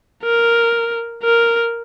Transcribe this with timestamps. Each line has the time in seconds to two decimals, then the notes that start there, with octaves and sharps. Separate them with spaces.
0.23 A#4
1.24 A#4